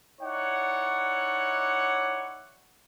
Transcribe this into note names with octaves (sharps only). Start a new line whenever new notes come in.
D#4 E4 C#5 D5 F#5